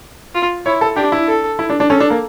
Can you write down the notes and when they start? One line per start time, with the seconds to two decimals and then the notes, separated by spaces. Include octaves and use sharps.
0.35 F4
0.66 E4 C#5
0.81 A4
0.96 D4 G4
1.12 E4
1.28 A4
1.59 E4
1.70 D4
1.80 D4
1.90 C#4 A4
2.00 D4
2.10 A#3